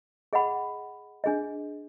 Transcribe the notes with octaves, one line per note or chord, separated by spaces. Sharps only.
G#4 D#5 F#5 B5
D4 G#4 D#5